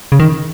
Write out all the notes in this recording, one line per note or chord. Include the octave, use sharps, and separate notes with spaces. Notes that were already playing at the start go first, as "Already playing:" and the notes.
C#3
D#3